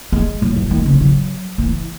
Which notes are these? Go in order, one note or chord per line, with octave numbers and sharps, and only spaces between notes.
G#3
F#3
E3
D#3
C#3
F#3
E3